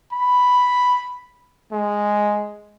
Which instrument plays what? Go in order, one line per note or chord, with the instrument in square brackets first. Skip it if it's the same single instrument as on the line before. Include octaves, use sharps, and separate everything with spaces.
[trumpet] B5
G#3